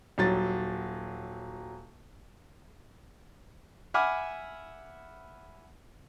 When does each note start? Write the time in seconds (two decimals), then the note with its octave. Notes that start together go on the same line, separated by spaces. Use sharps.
0.18 D#1 F#3 A6
3.94 E5 F#5 G#5 B5 D6 F6